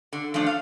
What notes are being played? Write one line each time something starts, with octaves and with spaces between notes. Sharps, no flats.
D3
F3 A3 D4
F5